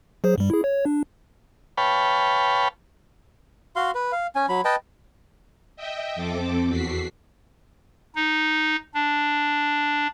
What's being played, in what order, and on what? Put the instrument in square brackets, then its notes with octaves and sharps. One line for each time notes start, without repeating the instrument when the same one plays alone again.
[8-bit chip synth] F#3 G#4 C5
G2 G3
E4 G#4
C#5
D4
[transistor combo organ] B4 C#5 F5 G5 A5 B5
[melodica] F#4 F5 C6
B4
F5
C#4 G#5
F#3 B5
B4 D#5 G5 A5
[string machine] D#5 E5 G5
F2 C4 A4 D6
E2 F#4 B6 C7
[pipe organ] D#4
D4